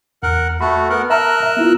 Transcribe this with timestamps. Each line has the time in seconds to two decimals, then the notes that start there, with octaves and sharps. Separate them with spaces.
0.23 E2 A#4 F#5
0.61 A3 F#4 B5
0.89 B3 A#4 F#5
1.10 A#4 E5 A5 A#5 E6 F#6
1.43 E5
1.57 B3 E4 F4